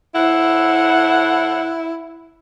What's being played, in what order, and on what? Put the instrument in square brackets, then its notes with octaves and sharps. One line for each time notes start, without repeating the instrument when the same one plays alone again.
[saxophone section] A2 C5 F#5 [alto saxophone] E4